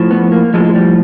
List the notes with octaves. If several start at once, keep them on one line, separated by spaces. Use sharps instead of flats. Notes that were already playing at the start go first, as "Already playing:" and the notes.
Already playing: A2 F3
B3
A#3
A2 F3 G#3
G#3
G3